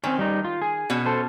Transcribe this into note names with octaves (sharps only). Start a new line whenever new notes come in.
D#3 C4 C#4
G3 D#4
F4
G#4
B2 C#4
A4 C5